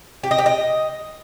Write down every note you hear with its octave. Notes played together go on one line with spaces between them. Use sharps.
G4
D#5
G4
D#5